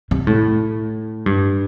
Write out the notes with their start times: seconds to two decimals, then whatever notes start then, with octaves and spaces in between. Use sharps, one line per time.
0.11 C3
0.27 A2
1.26 G2